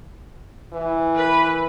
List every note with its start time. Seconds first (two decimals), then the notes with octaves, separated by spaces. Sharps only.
0.73 E3
1.15 B4